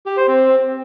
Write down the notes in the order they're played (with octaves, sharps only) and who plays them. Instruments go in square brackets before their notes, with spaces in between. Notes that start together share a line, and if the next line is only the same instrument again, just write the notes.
[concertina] G4
C5
C4